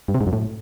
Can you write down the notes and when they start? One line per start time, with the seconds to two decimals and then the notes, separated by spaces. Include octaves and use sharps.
0.08 G2
0.15 C3
0.21 G#2
0.27 F#2
0.33 A2